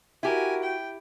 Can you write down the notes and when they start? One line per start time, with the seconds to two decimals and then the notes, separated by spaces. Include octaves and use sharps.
0.23 E4 F#4 G4 A#4 G#5
0.63 G5